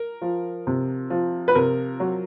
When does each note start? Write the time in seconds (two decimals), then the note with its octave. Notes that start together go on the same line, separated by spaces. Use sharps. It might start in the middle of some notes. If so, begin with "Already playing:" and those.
Already playing: A#4
0.22 F3
0.67 C3
1.10 F3
1.48 B4
1.55 C3 A#4
2.00 F#3